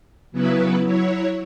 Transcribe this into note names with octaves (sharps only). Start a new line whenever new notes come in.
C#3 F#3 B3 E4 B4
F#3 E4 C#5